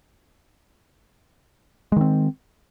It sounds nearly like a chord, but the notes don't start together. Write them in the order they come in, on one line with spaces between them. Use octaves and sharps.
G#3 D#3 C4